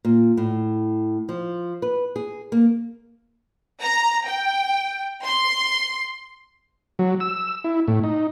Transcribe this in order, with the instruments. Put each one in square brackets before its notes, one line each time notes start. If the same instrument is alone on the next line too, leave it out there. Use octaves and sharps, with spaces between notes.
[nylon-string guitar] A#2
A2
F3
B4
G#4
A#3
[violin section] A#5
G5
C6
[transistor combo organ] F#3
E6
E4
A2
D#4